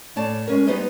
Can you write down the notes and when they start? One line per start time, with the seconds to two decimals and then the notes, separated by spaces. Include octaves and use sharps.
0.16 A2 C#5 D5 A5
0.47 G#3 C#4 A#4
0.67 G3 B3 D#4 B4 C5 D#5